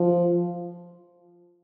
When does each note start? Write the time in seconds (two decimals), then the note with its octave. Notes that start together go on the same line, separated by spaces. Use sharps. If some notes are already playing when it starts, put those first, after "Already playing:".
Already playing: F3